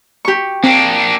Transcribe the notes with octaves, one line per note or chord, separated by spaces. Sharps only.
G4 C#6
A#3 C4 D4